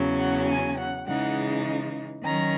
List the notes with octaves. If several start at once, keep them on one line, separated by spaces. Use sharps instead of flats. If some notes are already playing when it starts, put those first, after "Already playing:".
Already playing: E2 C#3 F#3 C#4
F#5
G#5
F#5
C#3 E3 G#3 D#4 F#5
D#3 F#3 C#4 A#5